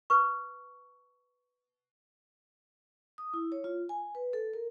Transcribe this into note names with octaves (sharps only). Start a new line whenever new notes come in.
B4 C#6
D#6
E4
C#5
F4
G#5
B4
A4
A#4